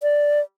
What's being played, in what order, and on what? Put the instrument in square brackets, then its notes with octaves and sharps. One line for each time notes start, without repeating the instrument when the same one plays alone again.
[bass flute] D5